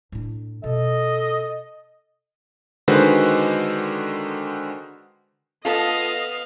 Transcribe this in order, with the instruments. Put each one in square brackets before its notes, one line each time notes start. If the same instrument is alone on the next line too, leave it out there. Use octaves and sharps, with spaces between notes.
[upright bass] A2 D4
[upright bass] B2 [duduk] A4 [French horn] D#5
[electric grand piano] D3 D#3 G#3 F#4 B4 C5
[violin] B3 F5 [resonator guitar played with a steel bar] F4 A4 [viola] D#5